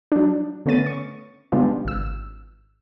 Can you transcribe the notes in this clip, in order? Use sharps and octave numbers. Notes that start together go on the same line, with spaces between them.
F#3 D4
D3 A3 B3 C#4 A6 D#7
C#6
C#3 G#3 B3 D4 F4 G4
G#1 E6